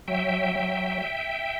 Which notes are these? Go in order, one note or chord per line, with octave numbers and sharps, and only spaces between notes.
F#3 E5 G5
F#3